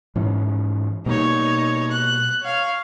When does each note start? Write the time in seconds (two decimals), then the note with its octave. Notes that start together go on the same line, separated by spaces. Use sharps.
0.16 G#2 E3 C#4
1.06 B2 G3 A#3 D#4 C#5
1.91 F#6
2.42 C#5 F5